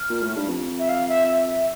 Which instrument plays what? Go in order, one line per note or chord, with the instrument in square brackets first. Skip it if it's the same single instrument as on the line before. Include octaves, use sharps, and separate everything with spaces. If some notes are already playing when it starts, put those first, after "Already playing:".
Already playing: [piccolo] F6
[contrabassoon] A#2
A2
G2
F2
[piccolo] E5
F5
E5
E5
E5